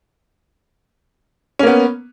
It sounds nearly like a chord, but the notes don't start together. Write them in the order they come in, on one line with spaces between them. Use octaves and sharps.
C#4 A#3 B3